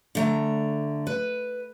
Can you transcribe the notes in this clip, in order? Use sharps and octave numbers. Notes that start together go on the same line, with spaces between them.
D3 A3 A#5
B4